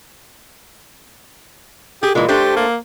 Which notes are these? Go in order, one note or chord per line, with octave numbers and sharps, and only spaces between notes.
G4 G#4
A#2 E3 G#3
A3 D4 G4 C5
A#3